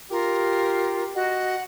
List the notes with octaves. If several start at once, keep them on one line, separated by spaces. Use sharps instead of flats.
F4 G4 A#4
F#4 D#5 F#5